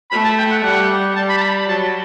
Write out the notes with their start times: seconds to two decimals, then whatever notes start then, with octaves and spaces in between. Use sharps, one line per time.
0.11 A3 B5
0.24 A5
0.38 G5
0.51 F#5
0.64 G3 F#5
1.16 G3 A5
1.29 B5
1.38 A5
1.42 B5
1.68 F#3 A5